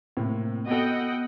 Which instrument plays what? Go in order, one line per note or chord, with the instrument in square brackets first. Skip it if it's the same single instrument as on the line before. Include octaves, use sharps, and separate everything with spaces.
[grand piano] A2 C3 A#3
[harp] B3 [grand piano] F#4 A4 [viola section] D#5 F#5 G5